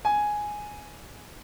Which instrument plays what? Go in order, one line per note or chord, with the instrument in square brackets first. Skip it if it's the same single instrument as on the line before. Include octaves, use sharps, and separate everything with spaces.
[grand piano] G#5